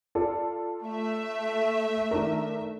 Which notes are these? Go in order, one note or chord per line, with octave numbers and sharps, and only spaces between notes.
F4 A4 D5
A3 E5
D#3 D4 A#4